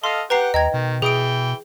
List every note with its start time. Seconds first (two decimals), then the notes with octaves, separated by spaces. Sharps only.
0.04 A4 D#5 F5 C6 F6
0.30 G4 B4 F#5 A#5 C7
0.54 D#2 D#5 G5 A#5 G#6
0.74 B2 D#3
1.02 B2 E3 G#4 G5 D#6 D7